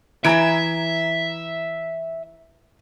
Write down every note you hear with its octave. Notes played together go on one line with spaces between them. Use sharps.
E3 D#5 E5 A#5 G#6 D7